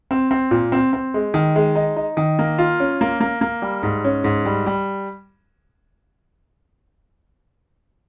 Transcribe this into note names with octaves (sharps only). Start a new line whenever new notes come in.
C4
C4
A#2
C4
C4
G#3
D#3
G#3
D#4
D#4
D#3
A#3
F4
C#4
A#3
A#3
A#3
G3
G#2
C#4
G#2
G3
G3